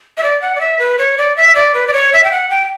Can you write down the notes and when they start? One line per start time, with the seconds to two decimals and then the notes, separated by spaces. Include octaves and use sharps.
0.17 E5
0.23 D5
0.42 F#5
0.56 D5
0.61 E5
0.79 B4
0.99 C#5
1.18 D5
1.37 E5
1.55 D5
1.74 B4
1.87 D5
1.93 C#5
2.13 E5
2.24 G5
2.31 F#5
2.50 G5